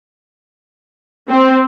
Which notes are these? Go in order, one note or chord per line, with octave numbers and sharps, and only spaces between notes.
C4